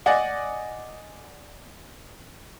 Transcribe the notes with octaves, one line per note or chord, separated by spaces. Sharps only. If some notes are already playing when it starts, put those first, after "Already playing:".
D5 D#5 F#5 G#5